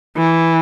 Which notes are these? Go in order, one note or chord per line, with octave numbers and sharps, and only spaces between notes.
E3